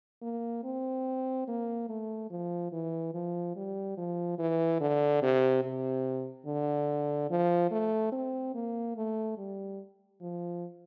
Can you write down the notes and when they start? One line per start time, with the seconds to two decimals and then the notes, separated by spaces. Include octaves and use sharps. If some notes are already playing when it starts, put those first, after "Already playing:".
0.22 A#3
0.64 C4
1.48 A#3
1.89 A3
2.30 F3
2.72 E3
3.14 F3
3.56 G3
3.97 F3
4.39 E3
4.81 D3
5.22 C3
5.63 C3
6.46 D3
7.30 F3
7.71 A3
8.13 C4
8.54 A#3
8.97 A3
9.37 G3
10.21 F3